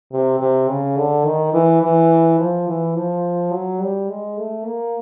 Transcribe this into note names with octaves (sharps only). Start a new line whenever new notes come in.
C3
C3
C#3
D3
D#3
E3
E3
F3
E3
F3
F#3
G3
G#3
A3
A#3